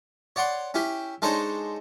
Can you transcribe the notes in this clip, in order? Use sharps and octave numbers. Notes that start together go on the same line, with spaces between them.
C#5 D5 F#5 C6
C#4 E4 G4
G#3 D4 D#4 A4 C5 C#5